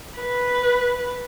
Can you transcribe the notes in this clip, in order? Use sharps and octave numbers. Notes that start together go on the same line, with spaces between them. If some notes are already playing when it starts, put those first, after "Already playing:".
B4